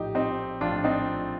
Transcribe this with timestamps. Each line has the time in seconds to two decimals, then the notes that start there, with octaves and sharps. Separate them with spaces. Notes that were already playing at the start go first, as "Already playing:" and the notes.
Already playing: A#1 A2 D#4 G4
0.15 C4 D#4
0.61 A#1 A2 D4 F4
0.84 C4 D#4